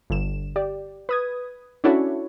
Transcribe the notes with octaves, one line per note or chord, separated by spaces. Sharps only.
G1 D3 E7
G4 D5
B4 D#6 G#6
C#4 D4 E4 F#4 A4 C#5